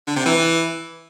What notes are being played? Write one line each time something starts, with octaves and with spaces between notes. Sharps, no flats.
D3
C3
E3